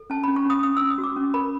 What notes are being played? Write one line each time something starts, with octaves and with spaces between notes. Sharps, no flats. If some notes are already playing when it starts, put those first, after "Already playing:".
Already playing: A4
C#4 A5
C#4 B5
C#6
C#4 D#6
C#4 D#6
C#4 E6
D#6
F#4
D6
C#4
A#4 B5